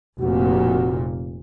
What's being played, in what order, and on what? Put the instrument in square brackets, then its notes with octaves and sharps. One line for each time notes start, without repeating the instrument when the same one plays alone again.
[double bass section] F1 A#2 [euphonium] F#4